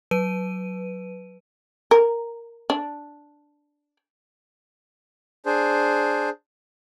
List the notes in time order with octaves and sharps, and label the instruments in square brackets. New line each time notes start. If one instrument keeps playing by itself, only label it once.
[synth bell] F#3 B4 D#7
[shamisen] A#4
D4
[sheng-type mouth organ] D4 G#4 C5